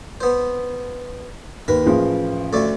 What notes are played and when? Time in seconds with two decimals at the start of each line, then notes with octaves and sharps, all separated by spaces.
0.21 B3 C5
1.68 D#2 A#4 B4
1.86 A1 F3 G#4
2.53 D2 A3 D5